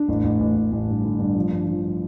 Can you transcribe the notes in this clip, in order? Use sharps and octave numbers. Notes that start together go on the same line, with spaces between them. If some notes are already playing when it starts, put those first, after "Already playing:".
Already playing: D4
A1
A1
A1
A1
A1
G2
D3
G2
F3
G2
F3